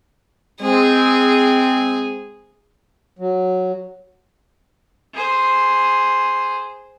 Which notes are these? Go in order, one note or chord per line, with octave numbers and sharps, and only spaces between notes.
G#3 C4 G#4
F#3
G#4 C5